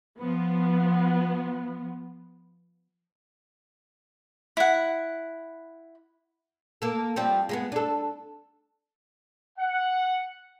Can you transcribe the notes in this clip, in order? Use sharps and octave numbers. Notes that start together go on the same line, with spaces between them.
F3 B3
E4 F#5
A#3 A4
F3 G3 C4
G#3 A#3 B3
D4 A4
F#5